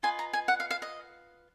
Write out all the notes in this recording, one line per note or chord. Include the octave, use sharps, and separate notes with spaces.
F4 B4 D#5 G#5
A#5
G#5
F#5
F5
F5
D#5